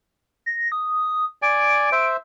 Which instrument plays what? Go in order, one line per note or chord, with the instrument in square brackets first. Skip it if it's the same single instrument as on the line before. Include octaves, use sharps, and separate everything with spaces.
[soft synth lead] A#6
D#6
[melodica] D5 G#5 [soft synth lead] D7
[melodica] C5 E5